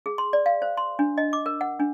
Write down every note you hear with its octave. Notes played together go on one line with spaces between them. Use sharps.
G#4
C6
D5
F5
C5
C6
D4
D#5
D6
A#4
F#5
D4